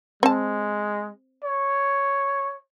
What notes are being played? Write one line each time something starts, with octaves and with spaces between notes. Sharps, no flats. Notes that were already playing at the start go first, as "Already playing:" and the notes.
G#3 C4 A5
C#5